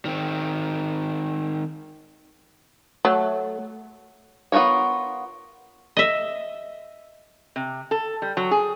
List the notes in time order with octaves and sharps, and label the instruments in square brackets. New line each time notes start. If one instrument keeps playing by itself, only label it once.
[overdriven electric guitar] D#3 C4
[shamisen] F#3 [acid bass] A3
[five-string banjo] B3 F4 F#4 A#4 C#5
[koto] D#5 E5
[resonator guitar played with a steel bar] C3
A4
G3
F#3
G#4